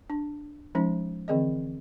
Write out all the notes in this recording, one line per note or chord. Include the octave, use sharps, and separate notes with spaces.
D4
F3 G#3 C#4 D#4
D3 E3 C4 G#4 D5 D#5